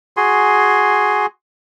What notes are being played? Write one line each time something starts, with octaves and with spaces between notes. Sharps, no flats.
F#4 G#4 G#5 C6